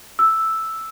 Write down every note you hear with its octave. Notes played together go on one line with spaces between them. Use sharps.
E6